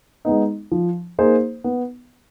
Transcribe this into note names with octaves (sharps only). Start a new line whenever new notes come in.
G#3 B3 D#4
F3
A#3 D#4 G#4 C5
B3